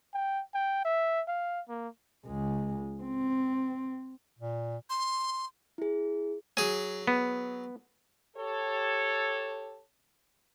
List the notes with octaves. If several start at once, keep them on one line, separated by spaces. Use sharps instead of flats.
G5
G5
E5
F5
A#3
C#2 G#3
C4
A#2
C6
E4 G#4
F#3 G#4 G#5
B3
G4 A4 C#5